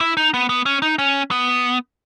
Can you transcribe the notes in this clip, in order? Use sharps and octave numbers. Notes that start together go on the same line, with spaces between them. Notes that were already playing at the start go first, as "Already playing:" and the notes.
E4
D#4
B3
B3
C#4
D#4
C#4
B3